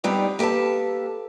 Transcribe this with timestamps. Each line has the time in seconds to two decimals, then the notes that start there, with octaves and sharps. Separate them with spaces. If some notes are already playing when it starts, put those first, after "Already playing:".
0.04 G3 B3 C4 D#4 G4 D5
0.39 A#3 G4 A4 B4 A5